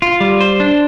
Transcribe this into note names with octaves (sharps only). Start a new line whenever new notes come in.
F4
G3
C5
D4